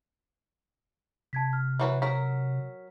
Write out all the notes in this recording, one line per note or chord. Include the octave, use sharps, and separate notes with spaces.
C3 A5 G#6 B6
F6
E3 F#3 B4
F#3 A#4 B6